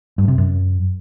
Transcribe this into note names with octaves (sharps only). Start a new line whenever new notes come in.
G2
C3
F#2